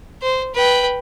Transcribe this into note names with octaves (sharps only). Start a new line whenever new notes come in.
C5
B4 G5